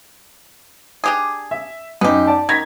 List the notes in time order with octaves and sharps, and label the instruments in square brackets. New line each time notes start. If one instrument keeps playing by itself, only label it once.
[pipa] D4 G4 G#4
[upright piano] E5
[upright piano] F#2 D#4 [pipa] B3 G4
[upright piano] D5 A5
[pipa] D#3 [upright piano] G#6 A#6 B6